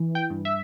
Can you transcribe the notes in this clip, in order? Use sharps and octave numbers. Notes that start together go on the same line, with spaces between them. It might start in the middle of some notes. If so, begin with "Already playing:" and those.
Already playing: E3
G5
G2
E5